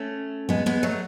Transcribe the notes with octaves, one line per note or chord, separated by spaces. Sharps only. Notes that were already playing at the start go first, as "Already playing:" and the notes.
Already playing: A3 C#4
G#3 B3
G#3 B3
F#3 A3